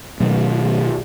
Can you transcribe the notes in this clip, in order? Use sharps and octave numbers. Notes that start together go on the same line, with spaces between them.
B2 D#3 F#3 A3